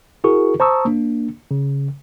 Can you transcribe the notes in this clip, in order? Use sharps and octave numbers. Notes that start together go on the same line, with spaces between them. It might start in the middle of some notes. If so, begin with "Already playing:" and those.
E4 F#4 G#4 A#4 C#6
C5 A5 A#5 C#6 D#6 E6
A#3 D4
C#3